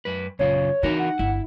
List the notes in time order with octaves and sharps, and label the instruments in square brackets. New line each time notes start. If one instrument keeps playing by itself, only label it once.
[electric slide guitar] F#2 B4
[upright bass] A#1 [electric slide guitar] F#2 C#3 F4 [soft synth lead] C#5
[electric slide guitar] E3 F#4 A#4 [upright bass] D#4
[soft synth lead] F#5
[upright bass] G1 [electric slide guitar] E4